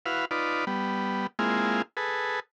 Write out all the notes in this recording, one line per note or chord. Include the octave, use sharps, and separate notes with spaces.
E4 F#4 B4 F5
D#4 F4 B4 D5
G3 B3
G#3 A#3 C4 E4 F4 G#4
G#4 A4 B4